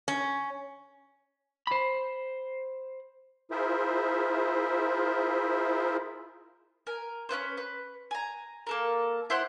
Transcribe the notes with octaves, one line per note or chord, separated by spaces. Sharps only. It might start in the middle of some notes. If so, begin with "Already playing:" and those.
C#4
C5 B5
E4 F4 G#4 A#4 C5 E5
A#4 G#5
C#4 E4 B4 C5
B4
G#5 A#5
A#3 A4 A#4
E4 C5 F#5 C6